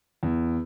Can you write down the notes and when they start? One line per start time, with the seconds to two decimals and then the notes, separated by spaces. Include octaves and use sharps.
0.23 E2